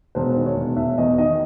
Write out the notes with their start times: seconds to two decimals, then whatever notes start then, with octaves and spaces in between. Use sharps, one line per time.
0.15 E1 C5
0.36 D#3
0.46 C#5
0.56 E1
0.77 E1 E5
0.98 E2 D#5
1.18 D#3 D#5